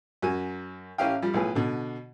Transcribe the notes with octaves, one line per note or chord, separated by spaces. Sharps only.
F#2 F#4 G#5
A1 C#4 E4 G4 F5 G5
F3 G3
B1 A2 F3 G#4 B4
B2 D3